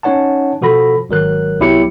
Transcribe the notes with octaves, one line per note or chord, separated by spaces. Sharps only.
C#4 D#4 C#5 F#5 A5
B2 F3 F#4 A4 B5 A#6
G#1 F#3 A#4 F#6
C2 F#3 B3 E4 G4 C#7